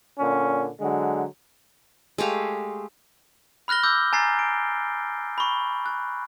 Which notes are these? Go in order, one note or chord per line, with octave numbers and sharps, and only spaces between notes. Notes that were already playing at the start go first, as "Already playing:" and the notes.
A#2 D3 C#4
D3 F#3 G#3
G#3 A3 G4 F5
B5 F6 F#6 A#6 G7
D6 E6 G6
G#5 A#5 A6 C7
D7
B5 C#6
F#6